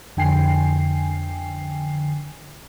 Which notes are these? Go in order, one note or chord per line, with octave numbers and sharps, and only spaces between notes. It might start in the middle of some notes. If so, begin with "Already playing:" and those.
F2 D3 G5 G#5 C7